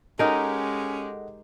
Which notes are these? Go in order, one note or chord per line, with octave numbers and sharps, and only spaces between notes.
G#3 C#4 D#4 G4 A4 A#4 D#5 F#5